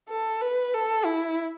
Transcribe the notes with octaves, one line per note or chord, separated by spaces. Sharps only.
A4
B4
A4
E4